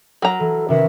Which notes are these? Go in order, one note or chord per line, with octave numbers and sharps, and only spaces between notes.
F#3 A#4 A#5
E3 A4
C3 D#3 C#4 F#4 A#4 B4 E5